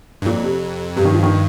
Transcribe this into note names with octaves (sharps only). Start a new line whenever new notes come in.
G2
F2 A#2
C3
G2 C3
D#3
F3
D#3